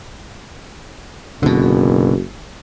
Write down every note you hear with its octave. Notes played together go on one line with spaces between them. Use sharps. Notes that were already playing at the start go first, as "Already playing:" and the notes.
F#1 B2 D3